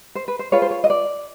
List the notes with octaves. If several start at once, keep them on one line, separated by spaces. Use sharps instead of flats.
C5
B4
C5
F4 G#4 B4 C#5
C5
C#5
D#5
D5